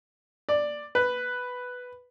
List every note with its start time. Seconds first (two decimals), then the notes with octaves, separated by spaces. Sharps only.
0.49 D5
0.95 B4